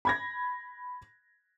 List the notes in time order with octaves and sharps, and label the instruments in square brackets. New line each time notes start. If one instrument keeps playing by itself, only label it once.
[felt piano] B5 G#6 A#6